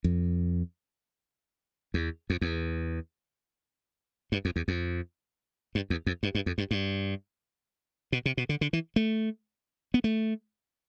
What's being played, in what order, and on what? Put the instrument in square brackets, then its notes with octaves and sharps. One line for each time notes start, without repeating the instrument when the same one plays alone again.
[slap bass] F2
E2
F2
E2
G2
F2
E2
F2
G2
E2
F2
G2
G2
F2
G2
G2
B2
C3
B2
D3
D3
E3
A3
B3
A3